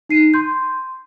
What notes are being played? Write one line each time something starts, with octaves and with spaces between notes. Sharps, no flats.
D#4 C7 D#7
C6 G6